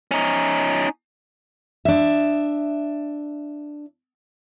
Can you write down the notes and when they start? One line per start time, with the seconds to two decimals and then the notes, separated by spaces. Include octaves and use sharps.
0.11 C#4 D#4
1.85 D4 E5